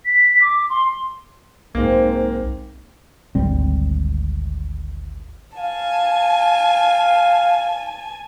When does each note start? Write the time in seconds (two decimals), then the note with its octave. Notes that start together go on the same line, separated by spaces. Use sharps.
0.05 B6
0.42 D6
0.70 C6
1.75 B1 G#2 A#3 C4
3.35 G#1 D2 G3 C4
5.58 F5 G#5 A5